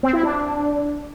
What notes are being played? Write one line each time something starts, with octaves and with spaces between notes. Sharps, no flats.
C4
E4
D4